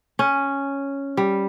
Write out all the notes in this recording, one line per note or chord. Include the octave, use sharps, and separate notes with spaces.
C#4
G3